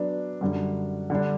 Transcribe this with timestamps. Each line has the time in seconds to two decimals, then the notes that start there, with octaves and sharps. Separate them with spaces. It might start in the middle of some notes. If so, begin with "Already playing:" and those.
Already playing: F#3 B3 D4
0.41 F#2 D3 G3
1.10 D3 G3 D4